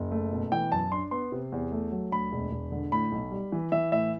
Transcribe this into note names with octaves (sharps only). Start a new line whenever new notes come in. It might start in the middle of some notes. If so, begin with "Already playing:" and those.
Already playing: F#1
A3
B2
E3 G5
F#2 A5
D4 C6
B3 C6
C3
E2
A3
F#3
D2 B5
E1
E1
D3
A2 B5
B1
G3
E3
E3 E5
A2 E5